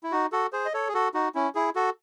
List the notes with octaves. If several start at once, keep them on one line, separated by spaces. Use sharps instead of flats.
E4
D#4 F#4
F#4 A4
G#4 C5
D#5
A4 C#5
G#4
F#4 A4
D#4 F#4
C#4 E4
E4 G#4
F#4 A4